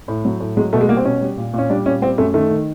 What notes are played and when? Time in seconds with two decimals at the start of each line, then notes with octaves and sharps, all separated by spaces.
0.08 A2
0.25 F#3
0.40 A2
0.57 F#3 G#3
0.73 B2 A3
0.81 G#3
0.89 G3 A#3
0.97 C4
1.05 B2 C#4
1.21 G3
1.37 A#2
1.53 A#2 C#4
1.70 G3 D4
1.86 A#2 C#4
2.02 G3 C4
2.18 F#2 A3
2.34 D#3 A3
2.50 D#3